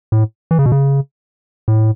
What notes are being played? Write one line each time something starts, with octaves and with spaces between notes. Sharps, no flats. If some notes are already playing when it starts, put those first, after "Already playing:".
A2
E3
C#3
B2
C#3
A2